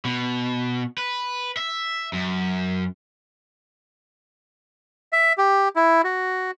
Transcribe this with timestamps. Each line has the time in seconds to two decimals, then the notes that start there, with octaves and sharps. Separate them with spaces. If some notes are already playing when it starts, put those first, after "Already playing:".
0.05 B2
0.98 B4
1.57 E5
2.13 F#2
5.13 E5
5.38 G4
5.76 E4
6.04 F#4